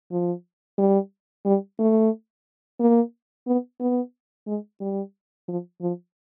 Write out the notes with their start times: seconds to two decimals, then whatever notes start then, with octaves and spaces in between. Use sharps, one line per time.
0.12 F3
0.78 G3
1.46 G3
1.79 A3
2.80 A#3
3.47 B3
3.80 B3
4.47 G#3
4.81 G3
5.48 F3
5.81 F3